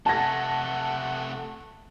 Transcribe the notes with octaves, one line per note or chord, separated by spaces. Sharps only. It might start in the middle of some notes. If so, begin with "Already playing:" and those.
C3 A3 F#5 A5 A#6